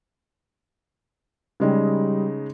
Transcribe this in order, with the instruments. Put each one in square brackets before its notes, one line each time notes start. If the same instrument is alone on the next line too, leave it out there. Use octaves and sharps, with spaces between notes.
[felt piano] C#3 G#3 D#4 [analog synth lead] G3